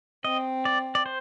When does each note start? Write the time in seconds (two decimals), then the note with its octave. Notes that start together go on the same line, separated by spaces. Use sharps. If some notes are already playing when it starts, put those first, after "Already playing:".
0.24 C4 D#5
0.65 D5
0.95 D5
1.06 C5